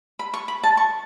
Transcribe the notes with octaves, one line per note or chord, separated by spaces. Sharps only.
B5
C#6
B5
A5
C#6